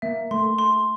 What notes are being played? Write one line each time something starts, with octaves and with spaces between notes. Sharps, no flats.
A#3 E5
A3 C6
C6